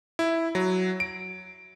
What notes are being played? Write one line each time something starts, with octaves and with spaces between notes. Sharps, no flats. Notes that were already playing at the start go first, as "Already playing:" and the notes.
E4
F#3
D7